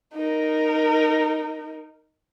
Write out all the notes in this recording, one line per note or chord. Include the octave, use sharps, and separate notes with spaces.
D#4 A#4